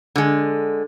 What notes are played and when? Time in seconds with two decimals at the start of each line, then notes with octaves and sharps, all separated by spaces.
0.16 D3 G#3